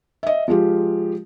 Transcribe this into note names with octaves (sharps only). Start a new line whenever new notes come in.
D#5 E5
F3 G#3 F4 G4